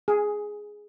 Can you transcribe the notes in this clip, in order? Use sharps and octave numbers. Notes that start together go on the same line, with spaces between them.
G#4